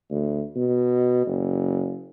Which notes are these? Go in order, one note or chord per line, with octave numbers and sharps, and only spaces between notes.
D2
B2
F#1